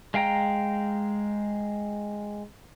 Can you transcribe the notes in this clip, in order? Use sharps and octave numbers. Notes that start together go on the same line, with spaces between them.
G#3 F5 G5 A#5